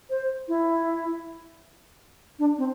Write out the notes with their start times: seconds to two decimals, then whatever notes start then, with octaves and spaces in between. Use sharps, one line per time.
0.10 C5
0.48 E4
2.39 D4
2.58 C4